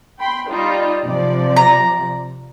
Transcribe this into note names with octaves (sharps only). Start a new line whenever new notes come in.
G5 B5 C6
G3 D#4 F4
C3 F3 D5
A#5